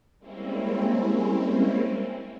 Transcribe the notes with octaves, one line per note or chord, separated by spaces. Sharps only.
G3 G#3 A#3 C4 C#4 E4